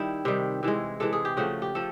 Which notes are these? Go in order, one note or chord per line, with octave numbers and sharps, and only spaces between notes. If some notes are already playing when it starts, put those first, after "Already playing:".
Already playing: D#3 G3 E4
C3 D#3 G3
C3 E3 G#3
C3 E3 G#3 A4
G#4
G4
C#3 F3 A3 F#4
G4
F3 A3 A4